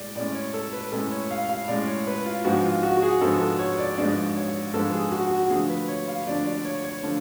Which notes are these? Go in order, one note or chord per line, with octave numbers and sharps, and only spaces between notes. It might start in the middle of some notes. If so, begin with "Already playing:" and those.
Already playing: A2 G#3 D5
A2 G#3 C#4 D5
C#5
A4
B4
A2 G#3 C#4 A4
C#5
F5
F5
A2 G#3 C#4 D5
C#5
B4
F4
G#2 F3 G#3 B3 D4 F#4
F4
F#4
F#4
G#4
G#2 F3 G#3 B3 D4 A4
A4
C#5
D5
G#2 F3 G#3 B3 D4 D5
C#5
G#2 F3 G#3 B3 D4 A4
G#4
F#4
F#4
D3 F3 A3 D4 G#4
B4
C#5
F5
D3 F3 A3 D4 D5
D5
C#5
C#5
D3 F3 A3 D4